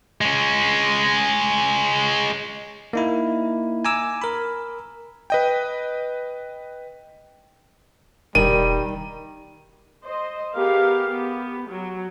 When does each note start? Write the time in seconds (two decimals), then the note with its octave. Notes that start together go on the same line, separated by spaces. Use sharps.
0.21 G#3 C#4
2.93 A#3 D#4 E4
3.85 G#5 A#5 D6 E6
4.22 A#4 B5
5.30 B4 D#5 G5
8.35 E1 D#3 G3 D#7
10.03 C5 D#5
10.54 B3 G4 G#4 A#4 F5
11.09 B3 G4
11.67 F#3